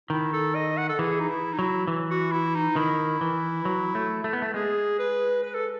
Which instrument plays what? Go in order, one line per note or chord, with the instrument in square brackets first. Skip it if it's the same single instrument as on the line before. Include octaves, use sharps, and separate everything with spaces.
[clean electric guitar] D#3 [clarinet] E4
[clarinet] A4
D#5
F#5
A4
[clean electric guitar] E3 [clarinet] G#4
[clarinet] D#4
E4
D#4
[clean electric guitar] F#3 [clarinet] E4
[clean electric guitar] E3
[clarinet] F#4
E4
D#4
[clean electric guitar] D#3 [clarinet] E4
[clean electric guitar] E3
F#3
A3
A3
B3
A3
[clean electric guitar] G#3 [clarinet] G#4
[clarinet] B4
B4
A4